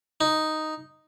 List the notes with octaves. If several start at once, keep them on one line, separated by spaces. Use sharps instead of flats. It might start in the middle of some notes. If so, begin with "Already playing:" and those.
D#4